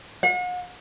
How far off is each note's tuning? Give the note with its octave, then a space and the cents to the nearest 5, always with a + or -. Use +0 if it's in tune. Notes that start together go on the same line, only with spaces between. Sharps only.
F#5 -40